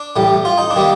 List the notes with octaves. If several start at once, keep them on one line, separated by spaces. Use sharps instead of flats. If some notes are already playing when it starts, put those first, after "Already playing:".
Already playing: D4
A1 A2 G3
F4
D#4
D4
D#3 G3 A#3